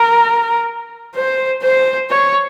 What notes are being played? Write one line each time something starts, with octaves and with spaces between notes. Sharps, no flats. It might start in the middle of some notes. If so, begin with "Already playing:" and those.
Already playing: A#4
C5
C5
C#5